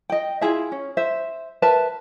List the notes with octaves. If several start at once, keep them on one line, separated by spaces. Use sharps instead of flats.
D#5 G5
E4 F4 G#4 E5
C#4
C5 E5
A#4 B4 E5 A5